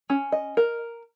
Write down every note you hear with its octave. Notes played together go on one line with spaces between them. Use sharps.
C#4
D#5
A#4